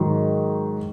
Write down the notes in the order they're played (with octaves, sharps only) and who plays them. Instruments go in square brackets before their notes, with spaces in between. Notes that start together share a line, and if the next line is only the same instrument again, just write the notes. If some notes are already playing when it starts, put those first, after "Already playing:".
Already playing: [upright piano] G#2 D#3 F#3